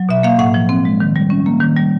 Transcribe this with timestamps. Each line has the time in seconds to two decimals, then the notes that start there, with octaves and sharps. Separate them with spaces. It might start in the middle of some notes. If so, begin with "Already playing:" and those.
Already playing: F#3
0.09 B2 E5
0.23 A#3 F5
0.39 A2 F#5
0.54 F3
0.69 C4
0.85 G#3
1.00 D#3
1.16 G3
1.30 C#4
1.46 A#3
1.60 D#3
1.77 G3